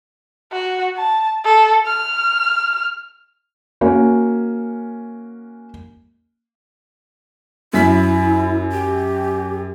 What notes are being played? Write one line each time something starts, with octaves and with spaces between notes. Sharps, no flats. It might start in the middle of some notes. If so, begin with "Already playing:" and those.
F#4
A5
A4
F6
A#3 C#4 F#4
F#2 E4 B6
G4